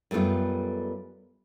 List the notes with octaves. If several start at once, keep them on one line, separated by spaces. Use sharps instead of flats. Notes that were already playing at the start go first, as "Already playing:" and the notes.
F#2 G3 A3 B3 F4